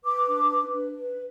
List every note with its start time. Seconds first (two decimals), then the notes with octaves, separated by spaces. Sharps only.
0.04 B4 D6
0.28 D4
0.51 B4
0.73 D4
0.97 B4